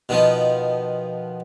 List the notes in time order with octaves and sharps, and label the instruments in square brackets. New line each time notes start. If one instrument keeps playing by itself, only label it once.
[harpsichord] B2 D#3 F3 B3